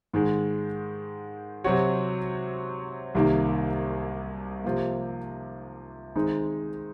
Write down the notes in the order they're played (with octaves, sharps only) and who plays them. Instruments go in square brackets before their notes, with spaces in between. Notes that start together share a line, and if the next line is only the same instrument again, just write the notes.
[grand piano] G#2 D#3 G#3
C3 F#3 C4 F#4 C#5
C2 C3 D#3 A#3
C3 F3 A#3
D#3 G#3 C4 D#4